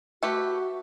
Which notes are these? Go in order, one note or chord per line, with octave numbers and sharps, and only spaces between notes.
A3 F#4 G4 B4